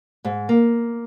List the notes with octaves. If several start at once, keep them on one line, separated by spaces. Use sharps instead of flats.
G#2
A#3